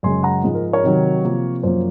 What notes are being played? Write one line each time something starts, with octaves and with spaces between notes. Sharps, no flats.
F#2 C#3 G#3 G#5 C6
F#5 A#5
G#2 F3 G#3
A#4
A#4 C#5
C3 D#3 F#3
C3 F3 A#3
F#2 F3 A#3 C5